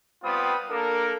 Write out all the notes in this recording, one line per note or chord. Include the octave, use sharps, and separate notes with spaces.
G3 B3 C4 F4 B5 D#6
A#3 D4 A4 A#4